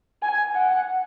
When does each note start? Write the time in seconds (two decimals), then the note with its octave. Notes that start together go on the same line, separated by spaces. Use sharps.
0.22 G#5
0.55 F#5